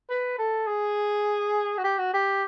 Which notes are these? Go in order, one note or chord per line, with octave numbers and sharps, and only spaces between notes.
B4
A4
G#4
F#4
G4
F#4
G4